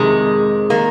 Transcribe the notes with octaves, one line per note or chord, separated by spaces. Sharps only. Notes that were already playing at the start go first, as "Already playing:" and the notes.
Already playing: F2 C3 D#3 G#3
D#3 A#3